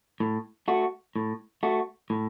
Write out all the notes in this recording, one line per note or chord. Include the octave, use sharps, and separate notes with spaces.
A2
A3 F#4
A2
A3 F#4
A2